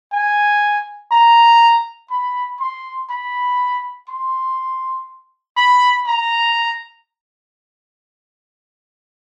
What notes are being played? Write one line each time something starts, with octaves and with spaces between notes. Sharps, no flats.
G#5
A#5
B5
C6
B5
C6
B5
A#5